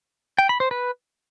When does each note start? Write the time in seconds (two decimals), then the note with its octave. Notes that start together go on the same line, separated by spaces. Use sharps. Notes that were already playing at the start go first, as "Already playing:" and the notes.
0.38 G5
0.49 B5
0.60 C5
0.71 B4